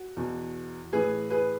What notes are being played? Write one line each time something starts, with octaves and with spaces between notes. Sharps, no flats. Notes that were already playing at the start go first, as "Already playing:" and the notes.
Already playing: F#4
E2 B2
A2 E3 G#4 B4
G#4 B4